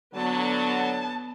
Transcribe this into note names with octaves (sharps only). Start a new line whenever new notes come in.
D3 F#3 B3 A5